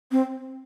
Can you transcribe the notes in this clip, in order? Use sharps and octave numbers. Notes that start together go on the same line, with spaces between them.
C4